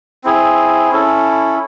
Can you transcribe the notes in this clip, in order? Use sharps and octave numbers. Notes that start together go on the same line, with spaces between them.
C4 E4 G#4
C#4 E4 A4